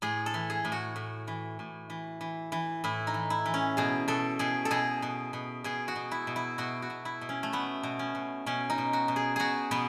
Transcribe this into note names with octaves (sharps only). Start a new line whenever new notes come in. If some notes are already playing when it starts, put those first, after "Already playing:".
A2 G#4
A4
E3
G#4
A2
F#4
A2
E3
A2
E3
E3
E3
A2 E4
D#4
E3
E4
E3
C#4
B2 G#4
B2 A4
B2 G#4
A4
B2 G#4
B2
B2
B2 G#4
F#4
B2
E4
B2
E4
B2 F#4
F#4
B2
E4
B2
C#4
A3
B2 B3
B2
C#4
B2
B2 C#4
D#4
B2
F#4
B2
G#4
B2 F#4 G#4
B2 B3